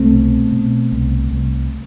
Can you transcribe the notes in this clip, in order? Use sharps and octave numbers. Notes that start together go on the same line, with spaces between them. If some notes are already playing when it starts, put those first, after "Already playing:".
Already playing: C2 A3 C4
B2
B2
C2
C2